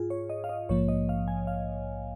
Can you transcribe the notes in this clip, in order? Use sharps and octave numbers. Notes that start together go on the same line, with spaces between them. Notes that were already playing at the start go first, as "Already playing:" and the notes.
Already playing: G#2 F4 G#4
C#5
D#5
F5
D#5
A#1 G#2 F3 A#3 C#5
D#5
F5
G#5
F5